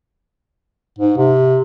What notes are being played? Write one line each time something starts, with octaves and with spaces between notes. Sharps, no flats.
G#2
C3